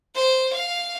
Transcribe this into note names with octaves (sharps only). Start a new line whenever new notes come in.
C5
F5